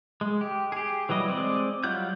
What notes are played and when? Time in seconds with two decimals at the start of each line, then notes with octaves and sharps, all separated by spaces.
0.21 G#3
0.41 G4
0.72 G4 G#4
1.09 E3 F#3 G3 D#5
1.28 G#3 C4 D5 D#5
1.84 F#3 G3 F4 F#5 G6